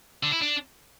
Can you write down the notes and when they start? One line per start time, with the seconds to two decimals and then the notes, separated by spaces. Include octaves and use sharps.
0.23 D3
0.32 E4
0.42 D4